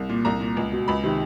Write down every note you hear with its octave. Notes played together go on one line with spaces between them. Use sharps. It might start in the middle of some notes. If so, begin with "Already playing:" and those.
Already playing: C2
A#2
C2 A#5
A#2
C#2
B2
C#2 B5
C3 D#3